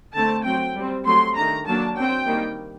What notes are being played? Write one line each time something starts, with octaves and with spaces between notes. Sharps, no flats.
D3 A3 C4 A5
F#3 C4 G5
G3 C4
F#3 A3 C4 C6
D#3 A3 D4 A#5
F#3 A#3 D4 A5
F#3 C4 G5
D#3 G3 A#3